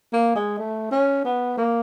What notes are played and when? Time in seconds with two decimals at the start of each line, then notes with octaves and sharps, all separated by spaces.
0.13 A#3
0.35 G#3
0.58 A3
0.91 C#4
1.25 B3
1.58 A#3